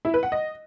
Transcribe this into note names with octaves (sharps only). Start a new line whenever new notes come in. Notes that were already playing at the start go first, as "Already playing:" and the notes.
E4
B4
F#5
D#5